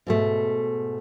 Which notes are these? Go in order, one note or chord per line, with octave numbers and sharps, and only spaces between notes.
G#2 B2 A3